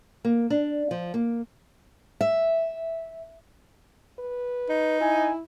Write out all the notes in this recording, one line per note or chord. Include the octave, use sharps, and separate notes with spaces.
A#3
D4
F3
A#3
E5
B4
D#4
E4 G#5